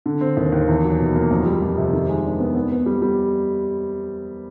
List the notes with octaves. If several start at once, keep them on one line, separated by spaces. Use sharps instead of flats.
D3
C4
D#2
D#2
E2
F#3
B2
A#3
F2
G3
F2
C3
D#3
G#3
D4
B3
B3
B3
G3
G3